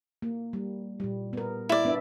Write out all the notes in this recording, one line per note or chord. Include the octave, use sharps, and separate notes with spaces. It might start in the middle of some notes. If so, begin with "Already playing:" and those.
A#3
G3
A#2 G3
B3 A#4
E4 D5
B3 D4 E5